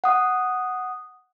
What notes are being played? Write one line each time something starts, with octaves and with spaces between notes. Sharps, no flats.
F#5 D#6